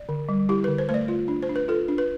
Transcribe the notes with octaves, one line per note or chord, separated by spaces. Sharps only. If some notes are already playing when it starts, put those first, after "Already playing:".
Already playing: D5
D3
G3
E4 G4
D3 B4
C5
A3 C5
D5
F4
D4
C5
D4
B4
F4 A4
D4
B4